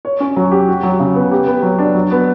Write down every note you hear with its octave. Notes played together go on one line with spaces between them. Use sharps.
C#5
C#4
F#3
G4
F#4
F#3
C#3
B3
G4
B3
F#3
D4
F#3
B3